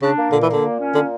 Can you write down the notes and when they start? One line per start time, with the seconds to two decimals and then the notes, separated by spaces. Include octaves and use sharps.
0.01 C#3 D4
0.17 A#3
0.32 A#2 D3
0.42 E3
0.48 D3 A#3
0.63 A#2
0.79 C#4
0.94 A#2 D3